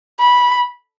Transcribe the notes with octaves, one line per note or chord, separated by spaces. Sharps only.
B5